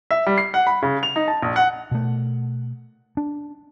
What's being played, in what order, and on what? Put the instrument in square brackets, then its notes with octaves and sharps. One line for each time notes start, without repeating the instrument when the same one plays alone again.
[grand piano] E5
G3
C7
F#5
B5
C#3
F7
D#4
A5
A#1
F#5
[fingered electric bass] B2 A3
D4